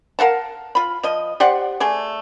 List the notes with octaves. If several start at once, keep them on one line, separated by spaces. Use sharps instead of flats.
A#4 F5 F#5 A5
F4 B5
F3 D#5
G4 C5 D5 F#5
A3 G#4 D5